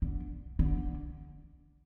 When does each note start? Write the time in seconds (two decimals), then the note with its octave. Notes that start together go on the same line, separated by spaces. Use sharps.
0.02 D3
0.59 D3